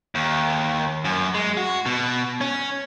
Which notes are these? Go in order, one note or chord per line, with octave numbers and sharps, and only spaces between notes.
D#2
F#2
G#3
F#4
B2
C#4